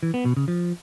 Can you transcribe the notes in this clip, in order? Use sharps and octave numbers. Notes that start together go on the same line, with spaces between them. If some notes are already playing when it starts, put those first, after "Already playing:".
E3
B3
B2
C#3
F3